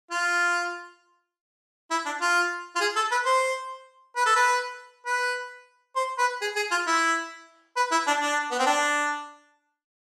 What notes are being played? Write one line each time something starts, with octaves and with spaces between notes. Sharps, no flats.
F4
E4
D4
F4
F4
G#4
A4
B4
C5
B4
A4
B4
B4
C5
B4
G#4
G#4
F4
E4
B4
E4
D4
D4
B3
C4
D4